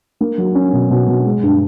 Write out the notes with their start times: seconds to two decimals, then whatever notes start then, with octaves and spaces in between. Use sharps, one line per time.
0.21 A#3
0.38 F#3
0.55 C#4
0.73 B2
0.90 B2
1.08 B2
1.25 G#3
1.43 G2